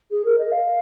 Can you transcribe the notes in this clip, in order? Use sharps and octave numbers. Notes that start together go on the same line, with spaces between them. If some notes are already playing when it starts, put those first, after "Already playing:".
G#4
A#4
D#5
F5